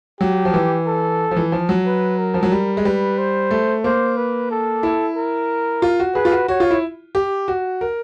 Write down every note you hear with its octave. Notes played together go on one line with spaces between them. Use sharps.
F#3 G4
F3
E3
A4
F3
E3
F3
F#3
B4
A#4
F3
F#3
G3
G#3
G3 B4
C5
A3
A#3 C5
B4
A4
E4
A#4
F4
F#4
G#4 B4
F4
F#4
F#4 C#5
F4
E4
G4
F#4
A#4